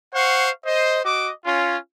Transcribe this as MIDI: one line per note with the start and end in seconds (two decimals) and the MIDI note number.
0.14 0.50 72
0.14 0.50 77
0.14 0.50 78
0.14 0.50 85
0.66 1.00 72
0.66 1.00 75
1.04 1.30 66
1.04 1.30 75
1.04 1.30 86
1.45 1.76 61
1.45 1.76 65